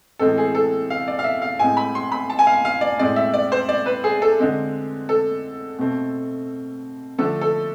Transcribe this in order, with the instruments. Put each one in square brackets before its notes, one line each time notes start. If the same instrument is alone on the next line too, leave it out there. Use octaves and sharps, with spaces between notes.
[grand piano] A2 E3 G#3 C4 A4
G#4
A4
F5
D5
F5
E5
F5
A2 G#3 C4 G#5
B5
C6
B5
A5
G#5
F5
F5
D5
A2 G#3 C4 D5
E5
D5
C5
D5
B4
G#4
A4
D3 G#3 C4
A4
B2 A3 C4
D3 F3 A3 A4
A4